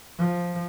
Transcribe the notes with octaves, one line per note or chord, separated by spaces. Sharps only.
F3